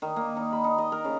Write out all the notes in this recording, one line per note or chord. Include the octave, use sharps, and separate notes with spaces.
D#3
A#3
D#4
B5
D#4
D#5
A#4
C#3